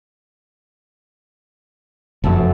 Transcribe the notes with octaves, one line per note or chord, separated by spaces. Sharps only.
F1 F#2 A3 A5